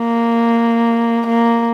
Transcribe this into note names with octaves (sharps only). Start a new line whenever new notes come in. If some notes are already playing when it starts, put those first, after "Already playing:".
Already playing: A#3
A#3